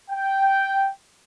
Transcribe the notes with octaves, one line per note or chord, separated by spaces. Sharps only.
G5